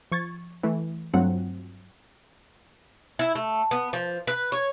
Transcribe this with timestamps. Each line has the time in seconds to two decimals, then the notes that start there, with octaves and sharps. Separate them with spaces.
0.11 F3 C#6 G#6 A6
0.63 E3 A3
1.13 G2 F#3 A3 C4 F4 F#5
3.19 E4
3.35 A3
3.71 B3
3.93 F3
4.27 B4
4.52 C#5